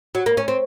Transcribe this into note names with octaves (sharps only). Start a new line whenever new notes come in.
F#3
A#3
C#4
C4